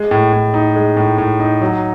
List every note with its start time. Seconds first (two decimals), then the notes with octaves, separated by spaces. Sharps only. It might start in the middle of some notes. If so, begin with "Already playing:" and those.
Already playing: G#3
0.11 A2
0.33 A2
0.54 D#4
0.75 G#3
0.97 A2
1.18 A2
1.40 D#4
1.61 F#3